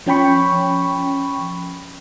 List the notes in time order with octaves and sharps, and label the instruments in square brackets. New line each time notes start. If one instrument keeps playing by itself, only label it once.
[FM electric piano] F3 C#4 G5 B5 C#6